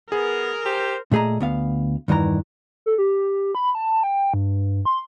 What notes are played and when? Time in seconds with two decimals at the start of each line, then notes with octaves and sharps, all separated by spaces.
0.12 B3 G#4 A#4
0.66 G4 C5
1.11 A#2 A3 G#4 D#5 A#5
1.40 D2 B3 F5
2.08 E2 G2 D#3 E3 A#5
2.86 A4
2.98 G4
3.55 B5
3.75 A5
4.03 G5
4.34 G2
4.85 C6